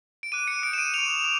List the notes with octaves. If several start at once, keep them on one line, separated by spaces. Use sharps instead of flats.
D7
D6 F#6 D#7
C#7
D#6 G6 D7
E7
D#7
C#6 F#6 F7
D6